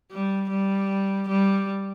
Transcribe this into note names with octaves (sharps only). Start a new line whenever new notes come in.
G3
G3
G3